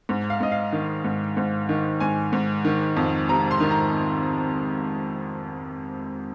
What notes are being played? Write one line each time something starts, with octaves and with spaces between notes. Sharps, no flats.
G#2
F5
G#2 D#5
F5
D#3
G#2
G#2
D#3
G#2 G#5
G#2
D#3
F2
C3 A#5
C6
D#3
A#5